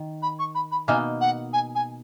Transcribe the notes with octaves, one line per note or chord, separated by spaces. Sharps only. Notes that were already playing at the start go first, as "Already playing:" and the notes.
Already playing: D#3
B5
C#6
B5
B5
B2 A#3 D#4 G#5
F#5
G#5
G#5